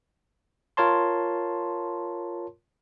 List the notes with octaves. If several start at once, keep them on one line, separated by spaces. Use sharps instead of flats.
F4 A#4 C#5 A5 C6